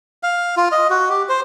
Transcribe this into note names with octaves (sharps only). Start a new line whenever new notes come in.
F5
F4
D#5
F#4
G4
C5